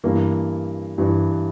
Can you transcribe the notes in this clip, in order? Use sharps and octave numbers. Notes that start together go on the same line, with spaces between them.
G2 E3 A#3
G2 E3